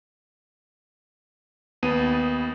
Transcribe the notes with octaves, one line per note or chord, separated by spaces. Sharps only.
D#2 B3 D#7